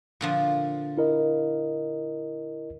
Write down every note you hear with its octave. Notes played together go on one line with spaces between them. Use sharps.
A#2 D3 F3
E4 A#4 D#5